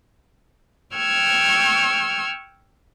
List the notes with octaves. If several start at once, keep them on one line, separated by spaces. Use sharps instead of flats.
G5 C#6 E6 F6 G#6